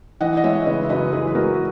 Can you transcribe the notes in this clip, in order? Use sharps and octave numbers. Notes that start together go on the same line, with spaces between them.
E3 D#5 F#5
D#5
G#3 C#5 E5
C#3 B4 D#5
E5
F#2 B4 D#5
E3 G#4 B4
B4
G#3 F#4 A#4